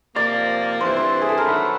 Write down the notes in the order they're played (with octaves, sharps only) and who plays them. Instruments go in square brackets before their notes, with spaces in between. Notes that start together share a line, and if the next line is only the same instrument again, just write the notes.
[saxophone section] C3 F3 A#3 [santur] D5
[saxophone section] G2 E3 A3 C4 E4 [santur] C5
[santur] C5
G#4
A4
A#4
[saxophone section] D#3 F#3 A3 D4 [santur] B4